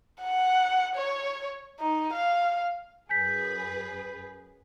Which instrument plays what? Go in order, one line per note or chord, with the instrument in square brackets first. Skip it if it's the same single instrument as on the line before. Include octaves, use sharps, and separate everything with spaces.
[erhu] F#5
C#5
D#4
F5
[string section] F#2 G#4 B4 [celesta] G#5 G6 B6